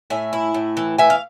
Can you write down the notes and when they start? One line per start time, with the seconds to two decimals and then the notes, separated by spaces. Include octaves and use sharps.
0.10 A2 E5 G#5
0.33 E4
0.54 A2
0.77 E3
0.98 E3 E5 G#5
1.10 F5